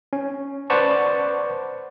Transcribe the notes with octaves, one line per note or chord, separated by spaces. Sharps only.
C#4
B4 C5 D5 F#5 A5 C#6